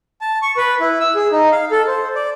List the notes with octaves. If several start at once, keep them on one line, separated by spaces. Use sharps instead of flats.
A5
C#6
B4
E4
E6
G#4
D#4
F5
A4
C5
D5